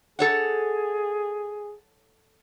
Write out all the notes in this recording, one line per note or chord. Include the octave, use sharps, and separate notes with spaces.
G#4 A4 C#5 F#5